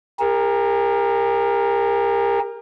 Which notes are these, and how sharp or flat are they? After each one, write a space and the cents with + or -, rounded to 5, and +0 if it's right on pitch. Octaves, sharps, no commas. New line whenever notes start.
G4 +45 A#4 +0